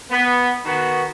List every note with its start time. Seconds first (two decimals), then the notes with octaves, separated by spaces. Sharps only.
0.11 B3
0.65 D#3 B3 F#4